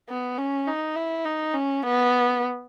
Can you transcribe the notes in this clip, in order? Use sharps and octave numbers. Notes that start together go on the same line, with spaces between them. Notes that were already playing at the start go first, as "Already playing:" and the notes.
B3
C#4
D#4
E4
D#4
C#4
B3